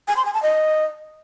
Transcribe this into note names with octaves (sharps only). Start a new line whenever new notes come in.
G#5
C6
G#5
A5
D#5